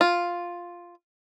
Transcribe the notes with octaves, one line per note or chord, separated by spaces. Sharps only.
F4